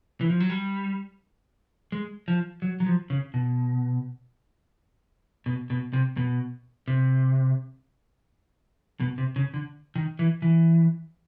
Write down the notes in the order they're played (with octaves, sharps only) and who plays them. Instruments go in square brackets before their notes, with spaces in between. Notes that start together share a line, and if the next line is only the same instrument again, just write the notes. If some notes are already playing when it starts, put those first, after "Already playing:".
[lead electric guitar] E3
F3
F#3
G3
G#3
F3
F#3
F#3
F3
C#3
B2
B2
B2
C3
B2
C3
B2
C3
C#3
D3
D#3
E3
E3